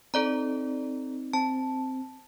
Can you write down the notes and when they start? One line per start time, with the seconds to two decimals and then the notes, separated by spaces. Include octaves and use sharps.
0.14 C4 D#4 A4 D5 A#5
1.33 C4 A5